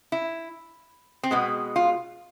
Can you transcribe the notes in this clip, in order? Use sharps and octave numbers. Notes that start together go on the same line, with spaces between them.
E4
C4
B2 G#3 B3
F4